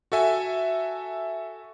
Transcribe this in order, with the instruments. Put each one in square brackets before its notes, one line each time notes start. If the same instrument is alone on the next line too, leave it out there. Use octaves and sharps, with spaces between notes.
[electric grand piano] F#4 A4 E5 G#5